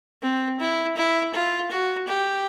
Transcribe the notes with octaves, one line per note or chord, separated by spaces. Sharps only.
C4
E4
E4
F4
F#4
G4